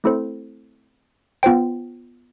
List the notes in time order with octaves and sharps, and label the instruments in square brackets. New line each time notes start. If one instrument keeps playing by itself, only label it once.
[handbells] A3 C4 E4 A4 C5
B3 F4 C5 G5